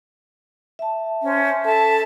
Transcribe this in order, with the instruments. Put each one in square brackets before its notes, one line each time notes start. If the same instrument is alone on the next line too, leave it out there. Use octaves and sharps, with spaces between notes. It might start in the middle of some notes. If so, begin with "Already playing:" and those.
[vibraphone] E5 A5
[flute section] C#4 C5
[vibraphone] A4 [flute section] E5 A5